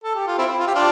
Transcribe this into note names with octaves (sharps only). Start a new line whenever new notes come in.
A4
G4
F4
C4 E4
F4
G4
D4 F4